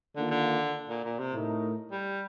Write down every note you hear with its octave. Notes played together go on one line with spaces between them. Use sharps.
D3 D#3 A#3 F4
D3
A#2
A#2
C3
A2 A3 D#4 A#4
G3